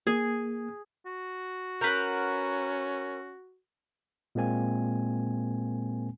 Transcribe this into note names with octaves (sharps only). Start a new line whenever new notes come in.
A#3 G#4
F#4
C#4 A#4 B4 F#5 G6
A#2 G#3 A#3 C4 G#5